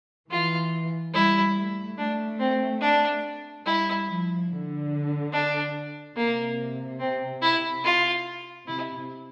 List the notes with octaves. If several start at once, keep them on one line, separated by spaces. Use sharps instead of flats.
E3 F4
G3 E4
A3
A3 D4
C4
D4
G3 E4
F3
D3
D4
C3 A#3
C4
E4
F4
C3 E4